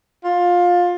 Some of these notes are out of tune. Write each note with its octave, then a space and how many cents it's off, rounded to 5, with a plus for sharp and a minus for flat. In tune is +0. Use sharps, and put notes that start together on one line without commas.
F4 +20